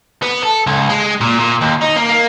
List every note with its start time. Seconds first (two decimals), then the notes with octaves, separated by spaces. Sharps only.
0.22 B3
0.42 A4
0.67 C#2
0.89 G#3
1.21 A#2
1.40 A#2
1.62 D#2
1.82 D#4
1.97 A#3
2.10 A#3